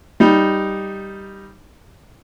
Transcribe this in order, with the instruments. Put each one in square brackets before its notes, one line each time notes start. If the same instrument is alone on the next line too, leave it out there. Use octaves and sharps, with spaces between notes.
[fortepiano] G3 D#4